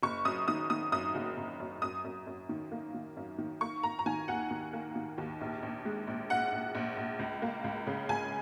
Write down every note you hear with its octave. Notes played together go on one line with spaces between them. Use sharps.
F#1 C#6
F#2 D#6
D#3 D#6
D#3 D#6
F#2 D#6
F#1
F#1
F#2
F#2 D#6
F#2
F#2
D#3
A#3
D#3
F#2
D#3
A#3 C#6
A#3 A#5
A#5
D#3 G#5
D#2 F#5
D#3
A#3
D#3
D#2
A#1
A#1
G#3
A#1
A#1 F#5
A#1
A#1
A#1
C#2
A#3
C#2
C#3
C#2 G#5